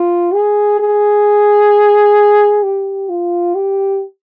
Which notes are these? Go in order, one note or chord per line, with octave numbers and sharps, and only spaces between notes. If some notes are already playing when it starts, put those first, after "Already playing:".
Already playing: F4
G#4
G#4
G4
F4
G4